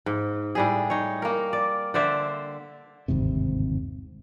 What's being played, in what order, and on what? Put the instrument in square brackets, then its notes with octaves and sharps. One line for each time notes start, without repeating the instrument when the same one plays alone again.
[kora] G#2
A2 G3 G#4
D#4 C#5
A#3 A#4
D5
D3 C5 D5 E5
[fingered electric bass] G1 D#2 G#2 C3